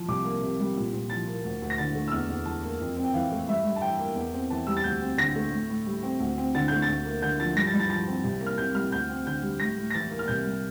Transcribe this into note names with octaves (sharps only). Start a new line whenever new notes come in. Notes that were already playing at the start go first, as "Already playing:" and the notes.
Already playing: F3
C2 D6
A#3
C3
G3
A#2
A#2
F3 A6
A#3
D2
D2
A#6
D3 A6
A3
E6
E2 F6
E2
E3 A5
A#3
F2
C4
G5
E3 F5
A3
G2 E5
G2
A5
E3 G5
A#3
E2
C4
E3 A5
G3 E6
A6
D2 G6
C4
D3 A#6
A3
A2
A2
G3
C4
D2
C4
D3 A6
A3 G6
A6
D2
A#3
D3 G6
F3 A6
G2 A#6
A6
G2
A6
F3 A6
C4
C2
A#3
F6
C3 G6
G3 F6
D2 G6
C4
D3 G6
G3
A2 A#6
A2
A#6
E3 A6
A#3
F6
C2 G6
G3